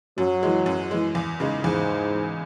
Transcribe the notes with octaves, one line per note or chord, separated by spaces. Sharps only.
F#2 F#3
E3 G#3
F#2
E3 G#3
E2
C#3 G#3 D#4
E2 G#2